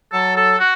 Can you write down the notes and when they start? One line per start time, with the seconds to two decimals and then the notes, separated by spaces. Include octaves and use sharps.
0.13 F#3 A4
0.37 A4
0.60 F#4